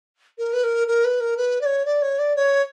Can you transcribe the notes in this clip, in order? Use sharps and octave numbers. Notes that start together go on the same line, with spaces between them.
A#4
B4
A#4
A#4
B4
A#4
B4
D5
C#5
D5
C#5
D5
C#5